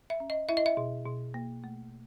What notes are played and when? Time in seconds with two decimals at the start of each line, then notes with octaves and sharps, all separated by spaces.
0.10 E5
0.20 C#4
0.30 D#5
0.49 E4 E5
0.57 D#5
0.66 E5
0.77 B2
1.06 B2
1.34 A#3
1.64 A3